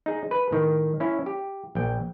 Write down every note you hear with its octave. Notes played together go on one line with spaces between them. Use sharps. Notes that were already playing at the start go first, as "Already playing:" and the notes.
D#4 G#4
B4
A2 D#3
C#4 E4
G4
A#1 G5